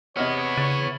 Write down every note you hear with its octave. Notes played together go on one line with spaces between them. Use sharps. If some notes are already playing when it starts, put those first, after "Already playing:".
C3 B3 E4 C#5 D#5 F6
C#3 C#6 A6 D#7